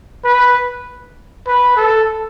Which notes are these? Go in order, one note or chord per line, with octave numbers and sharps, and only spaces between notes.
B4
B4
A4